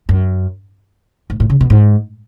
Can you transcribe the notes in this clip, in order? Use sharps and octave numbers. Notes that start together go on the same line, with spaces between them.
F#2
G#2
A2
C#3
B2
G#2